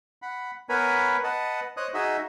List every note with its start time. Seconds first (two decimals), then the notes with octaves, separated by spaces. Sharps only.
0.22 F#5 B5
0.69 B3 A#4 B4 C#5 G#5 B5
1.24 B4 D#5 F#5 A5
1.77 C5 C#5 D#5 D#6 F#6
1.94 D#4 F#4 G#4 D#5 E5